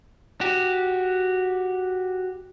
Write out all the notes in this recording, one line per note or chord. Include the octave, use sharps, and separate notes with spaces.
F#4 G4